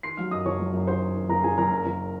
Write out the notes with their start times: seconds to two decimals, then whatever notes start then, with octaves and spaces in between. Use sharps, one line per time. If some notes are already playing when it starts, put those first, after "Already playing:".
0.03 D#3 C6 C7
0.17 F#3 F5 F6
0.31 F#2 D#5 D#6
0.46 F#1 C#5 C#6
0.60 F#3
0.73 F#2
0.87 D#3 C5 C6
1.02 D#3
1.16 D#3
1.29 F#1 A#4 A#5
1.44 F#1 G#4 G#5
1.58 F#1 A#4 A#5
1.72 F#2
1.85 F#1